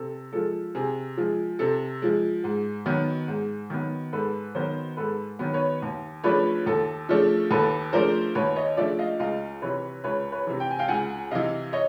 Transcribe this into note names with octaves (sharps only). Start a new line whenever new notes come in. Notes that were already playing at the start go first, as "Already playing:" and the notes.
Already playing: C3 A4
F3 G#3 A4
C3 G#4
F3 G#3
C3 A4
F3 G#3
G#2
D#3 F#3 B3
G#2
D#3 F#3 B3
G#2 A4 B4
D#3 F#3 B3 A#4 C5
G#2 A4 B4
D#3 F#3 B3
B4 C#5
D#2
C#3 F3 A3 D4 B4 C#5
D#2 A4
C#3 F3 A3 D4
D#2 A4 B4
C#3 F3 A3 D4 A#4 C5
D#2 B4 C#5
C#5 D#5
C#3 F3 A3 D4 D5 E5
D#5 F5
C#2 D#5 F5
C3 E3 B4 C#5
C#2 B4 C#5
B4 C#5
C3 E3
G5
G#5
F5 G5
C#2 F#5 G#5
C3 E3 D#5 F5
C#5 D#5